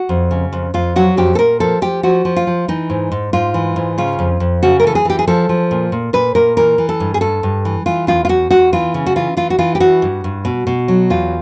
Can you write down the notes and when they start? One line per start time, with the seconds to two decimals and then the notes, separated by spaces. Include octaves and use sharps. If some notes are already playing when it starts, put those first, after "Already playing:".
Already playing: F#4
0.09 F2
0.31 C#3
0.53 F2
0.74 F2 F4
0.96 F#3 F#4
1.17 F2 G4
1.35 A4
1.39 A#2 A#4
1.60 F3 A4
1.82 F3 G4
2.03 F3 F#4
2.25 F3
2.36 F4
2.47 F3
2.68 E3 D#4
2.90 G#2
3.12 G#2
3.33 G#2 F4
3.54 E3
3.76 G#2
3.98 C#3 F4
4.19 F2
4.40 F2
4.63 C#3 F#4
4.80 A#4
4.84 E3 A4
4.95 G#4
5.05 E3 G4
5.19 G#4
5.27 F3 A4
5.49 F3
5.71 A#2
5.92 A#2
6.13 A#2 B4
6.35 A#2 A#4
6.57 E3 A#4
6.78 E3
6.89 A4
7.00 G2
7.14 G#4
7.21 G2 A4
7.43 G2
7.65 E3
7.86 E3 F4
8.07 E2 F4
8.25 F4
8.29 E2 F#4
8.51 E2 F#4
8.73 E3 F4
8.94 C#3
9.07 F#4
9.16 E3 F4
9.37 E3 F4
9.50 F#4
9.59 E3 F4
9.75 G4
9.80 E3 F#4
10.02 G2
10.24 G2
10.45 B2
10.67 B2
10.88 F#3
11.10 E2 F4